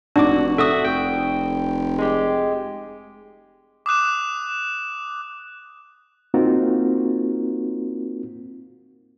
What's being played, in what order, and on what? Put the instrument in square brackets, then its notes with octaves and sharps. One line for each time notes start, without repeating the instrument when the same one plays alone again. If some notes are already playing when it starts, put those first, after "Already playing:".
[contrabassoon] F1 [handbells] D4 D#4 D6 [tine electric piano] F#4 [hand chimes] D5
[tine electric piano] F#4 E5 [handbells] A4 D#6
[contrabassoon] F1 [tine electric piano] G5
[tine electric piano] G#3 G4
[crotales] D6 D#6 F#6 E7
[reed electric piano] A#3 C4 D#4 F4 F#4 A#4